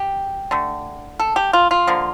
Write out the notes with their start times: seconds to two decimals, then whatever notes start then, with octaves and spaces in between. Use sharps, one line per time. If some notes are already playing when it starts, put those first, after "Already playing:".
Already playing: G4
0.51 D3 A3
1.19 A4
1.36 G4
1.53 F4
1.71 F4
1.87 D3 F3 A#3